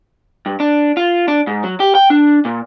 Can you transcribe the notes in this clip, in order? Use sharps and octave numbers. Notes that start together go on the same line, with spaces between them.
G2
D4
F4
D4
G#2
F#3
G4
G5
D4
A#2